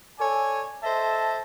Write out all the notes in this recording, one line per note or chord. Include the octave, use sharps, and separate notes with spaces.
A4 C#5 D5 G#5
A4 C5 D#5 E5 A5